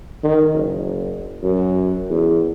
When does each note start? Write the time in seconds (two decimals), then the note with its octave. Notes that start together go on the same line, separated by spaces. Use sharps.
0.23 D#3
0.54 F#1
1.43 F#2
2.10 E2